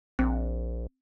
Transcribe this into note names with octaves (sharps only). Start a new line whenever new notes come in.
A#1 C4